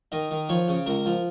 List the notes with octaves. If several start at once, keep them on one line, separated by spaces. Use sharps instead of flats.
D#3 D#5
D#3
F3 C#5
C#3
C#2 A#4
F3